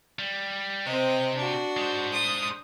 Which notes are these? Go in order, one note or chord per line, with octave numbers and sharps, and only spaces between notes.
G3
C3 C4 D#5
D4 F#4
G#3 C5
D#6